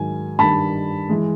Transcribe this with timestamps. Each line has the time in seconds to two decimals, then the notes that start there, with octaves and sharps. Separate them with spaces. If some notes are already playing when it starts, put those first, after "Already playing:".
Already playing: G#2 D#3 F#3 G#5
0.39 G2 D#3 G3 A5 B5
1.09 E3 G#3